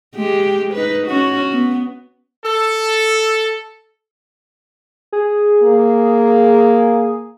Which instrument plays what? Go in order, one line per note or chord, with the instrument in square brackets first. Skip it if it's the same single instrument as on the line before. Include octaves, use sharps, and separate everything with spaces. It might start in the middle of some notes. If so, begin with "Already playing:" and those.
[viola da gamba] G#3 G4
D#4 B4
C#4 F#4
B3
[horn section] A4
[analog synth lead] G#4
[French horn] A#3